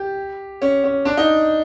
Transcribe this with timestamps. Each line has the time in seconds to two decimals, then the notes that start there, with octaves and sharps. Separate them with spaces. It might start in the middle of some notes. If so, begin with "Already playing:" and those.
Already playing: G4
0.62 C#4
0.84 C#4
1.05 D4
1.17 D#4